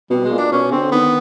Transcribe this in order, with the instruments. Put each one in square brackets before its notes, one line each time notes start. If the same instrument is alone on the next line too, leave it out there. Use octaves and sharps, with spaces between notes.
[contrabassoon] B2 [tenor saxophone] G3
[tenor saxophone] G#3
[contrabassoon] A#2
[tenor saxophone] D4
[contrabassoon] B2 [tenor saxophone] C#4
[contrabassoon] D3 [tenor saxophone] C4
[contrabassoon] D#3 [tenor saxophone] B3